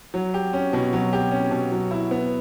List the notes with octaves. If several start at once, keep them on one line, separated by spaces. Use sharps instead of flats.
F#3
G4
C#4
B2
F#3
G4
C#4
B2
F#3
E4
B3